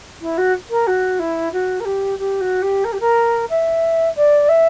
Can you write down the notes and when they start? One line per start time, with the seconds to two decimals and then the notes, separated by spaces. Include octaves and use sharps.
0.21 E4
0.37 F#4
0.70 A#4
0.87 F#4
1.19 E4
1.52 F#4
1.80 A#4
1.85 G4
2.18 G4
2.40 F#4
2.62 G4
2.84 A#4
2.92 G4
3.00 A#4
3.50 E5
4.16 D5
4.49 E5